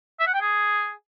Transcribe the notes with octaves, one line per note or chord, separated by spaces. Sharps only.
E5
F#5
G5
G#4